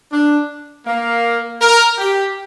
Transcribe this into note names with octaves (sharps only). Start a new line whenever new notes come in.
D4
A#3
A#4
G4